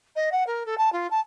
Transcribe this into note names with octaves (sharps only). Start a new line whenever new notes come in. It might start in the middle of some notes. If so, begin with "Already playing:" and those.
D#5
F#5
A#4
A4
A5
F4
A5